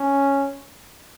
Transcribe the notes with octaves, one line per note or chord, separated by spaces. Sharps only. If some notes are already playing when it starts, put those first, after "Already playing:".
Already playing: C#4